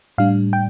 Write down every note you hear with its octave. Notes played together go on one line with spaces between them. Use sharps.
A2 G3 D4 F5
G5